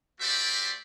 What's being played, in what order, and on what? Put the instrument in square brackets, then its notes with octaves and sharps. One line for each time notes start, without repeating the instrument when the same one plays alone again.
[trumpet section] A3 F#4 G4 C5 D5 E5